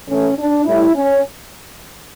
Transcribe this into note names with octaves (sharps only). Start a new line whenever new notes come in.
A2 E3 A3 C#4
D4
A2 G3 E4
C#4